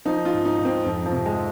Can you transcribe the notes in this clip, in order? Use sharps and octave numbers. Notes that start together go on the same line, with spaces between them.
F3 D#4
F4
G#2
D#4
G#2
C4
F2
F3
C3
G#3